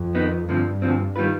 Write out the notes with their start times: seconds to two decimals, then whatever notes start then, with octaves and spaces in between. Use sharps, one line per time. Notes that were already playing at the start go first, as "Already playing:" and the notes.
Already playing: F2
0.15 D#3 B3 D#4
0.49 D2 G2 D3 F3 C4
0.82 D2 D3 F3 C4
1.16 D#3 G3 B3 F4 B4